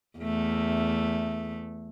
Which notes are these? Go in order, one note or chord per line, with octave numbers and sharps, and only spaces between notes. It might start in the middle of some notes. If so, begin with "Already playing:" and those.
E2 A3